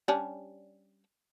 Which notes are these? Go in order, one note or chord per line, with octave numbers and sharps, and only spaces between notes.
G3 C#4 D4